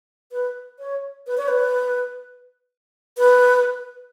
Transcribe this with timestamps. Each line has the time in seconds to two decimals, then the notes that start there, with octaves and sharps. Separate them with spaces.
0.32 B4
0.79 C#5
1.27 B4
1.37 C#5
1.48 B4
3.18 B4